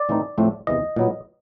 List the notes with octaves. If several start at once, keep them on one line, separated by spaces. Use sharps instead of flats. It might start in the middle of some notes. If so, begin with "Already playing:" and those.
Already playing: D5
A2 E3 A3 C4 D#4
A2 F3 A3 C4
E2 C3 E3 D#5
A#2 F#3 B3